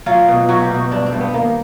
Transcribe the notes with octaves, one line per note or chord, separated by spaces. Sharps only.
F#3 F4
B2
F#3 F#4
G4
B2 F#4
G2 D4
C4
G2
B3
D#3 A#3